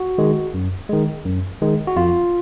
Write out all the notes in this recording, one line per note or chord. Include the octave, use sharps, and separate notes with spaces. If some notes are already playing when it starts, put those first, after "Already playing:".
Already playing: F#4
D#3 G#3
F#2
D#3 G#3
F#2
D#3 G#3
F#4
F2 F4